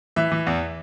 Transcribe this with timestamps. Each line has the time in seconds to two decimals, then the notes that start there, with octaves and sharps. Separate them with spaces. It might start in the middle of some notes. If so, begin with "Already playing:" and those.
0.16 E3 E5
0.32 E3
0.47 E2